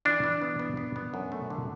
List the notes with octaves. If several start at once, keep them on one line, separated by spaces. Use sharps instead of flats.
E3 D4
E3
B3
B3
B3
B3
F#2
A3
D3